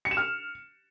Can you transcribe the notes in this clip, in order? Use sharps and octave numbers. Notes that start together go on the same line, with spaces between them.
C#7
E7
F6